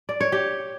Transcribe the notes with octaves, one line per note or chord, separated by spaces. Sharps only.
D5
C#5
G4